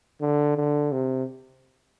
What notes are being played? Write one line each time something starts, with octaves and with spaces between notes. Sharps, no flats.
D3
D3
C3